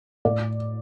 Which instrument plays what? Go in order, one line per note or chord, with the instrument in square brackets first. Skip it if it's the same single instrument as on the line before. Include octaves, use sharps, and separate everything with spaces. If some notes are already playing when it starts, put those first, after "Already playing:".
[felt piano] A2 D5